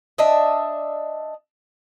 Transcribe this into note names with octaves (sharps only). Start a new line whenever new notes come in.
D4 D#5 E5